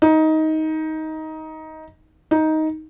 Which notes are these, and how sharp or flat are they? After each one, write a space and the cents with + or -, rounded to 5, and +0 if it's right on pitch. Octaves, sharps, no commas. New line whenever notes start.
D#4 +15
D#4 +10